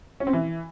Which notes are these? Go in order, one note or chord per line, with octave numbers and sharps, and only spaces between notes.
C#4
C4
E3